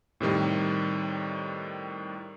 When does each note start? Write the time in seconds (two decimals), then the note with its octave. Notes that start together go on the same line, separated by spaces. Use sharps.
0.20 A2 C3 D#3 G3